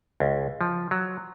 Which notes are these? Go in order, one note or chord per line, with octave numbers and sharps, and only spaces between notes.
C#2
F3
F#3